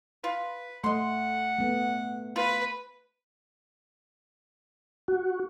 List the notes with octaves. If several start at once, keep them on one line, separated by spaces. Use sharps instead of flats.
F4 B4
A3 D#5 F#5 C6
A3 B3
F4 B4 B5
F#4